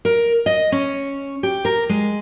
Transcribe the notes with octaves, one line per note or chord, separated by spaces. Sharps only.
A#4
D#5
C#4
G4
A#4
G#3